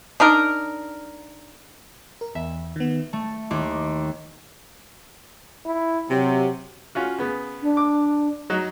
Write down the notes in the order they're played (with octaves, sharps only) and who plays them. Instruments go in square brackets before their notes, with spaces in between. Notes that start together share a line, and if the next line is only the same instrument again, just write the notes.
[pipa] D4 D#4 A#4
[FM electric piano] A#4
[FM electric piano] E2 [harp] E5
[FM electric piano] D#3 B3
[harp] A3 [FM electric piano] A5
[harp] D#2 [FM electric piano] D#5 C6 D6
[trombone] E4
[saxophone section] C3 [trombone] F#3
[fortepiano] C#4 F4 F#4
C#3 B3
[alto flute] D4
[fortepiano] D6
F#3 D#4